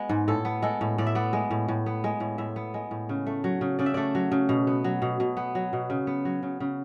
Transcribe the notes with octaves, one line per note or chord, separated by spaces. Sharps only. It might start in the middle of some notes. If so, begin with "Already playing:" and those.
Already playing: G#3 B3
G#2
A2 A4
B3
G#3 A4
A2
A2 D5
E5
B3 D5
G#3
A2
A2
B3
G#3
A2
A2 E5
B3
G#3
A2
C#3
A3
F#3
C#3
C#3 D5
E5
A3 D5
F#3
C#3
B2
B3
F#3
B2
B2
B3
F#3
B2
C#3
B3
F#3
C#3
C#3